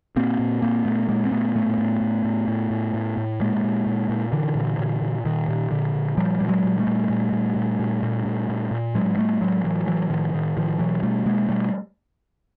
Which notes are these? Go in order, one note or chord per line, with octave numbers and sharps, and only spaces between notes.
A#2 A#3 C4
A#2
A#2 A#3 C4
A#2 A3 B3
A#2 G#3 A#3
C4
A#2 A3 B3
A2 A3 B3
A2
A2
A2
A2
A2
A2
A2
A#2 G#3 A#3
A#2
A#2
A#2
A#2 D3 E3
A#2
A#2
A#2
A#2 D#3
A#2
A#2 D3
A#2
A#2 F3 G3
A#2 G3
F#3 G#3
A#2
G3 A3
A#2
A#2
A#2
A#2
A#2
A#2
A#2
A#2
A#2
A2 F#3 G#3
A2 G3 A3
A2 F#3 G#3
A2 E3 F#3
A2 E3 F#3
A2 D#3 F3
A2 D#3
A2 D#3 F3
B2 E3 F#3
B2 G3 A3
B2 G#3 A#3
B2 G3 A3